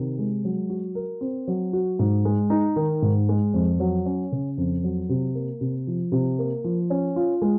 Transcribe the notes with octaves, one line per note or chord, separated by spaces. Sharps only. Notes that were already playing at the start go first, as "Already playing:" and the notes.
Already playing: C3 D#3
G#3
F#3
F#4
A#4
C4
F#3
F#4
G#2
G#3
D#4
D#3
G#2
G#3
F2
F#3
C#4
C#3
F2
F#3
C3
A#3
C3
F3
C3
A#3
F3
C#4
F4
G#3